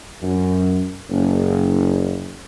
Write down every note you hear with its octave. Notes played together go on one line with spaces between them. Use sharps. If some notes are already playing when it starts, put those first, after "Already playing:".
F#2
F#1